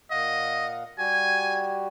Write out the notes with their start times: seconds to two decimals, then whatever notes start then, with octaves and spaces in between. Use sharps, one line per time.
0.11 A#2 D#5 F5 F#5
0.99 G3 F#4 G4 G#5